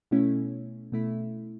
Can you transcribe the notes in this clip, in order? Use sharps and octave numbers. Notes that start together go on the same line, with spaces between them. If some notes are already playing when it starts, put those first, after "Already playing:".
B2 A3 C#4 E4
B2 A3 E4